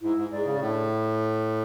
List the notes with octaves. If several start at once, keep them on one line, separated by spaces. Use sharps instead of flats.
G#2 E4
G#2
G#2 G#4 D5
C#3
A2 D4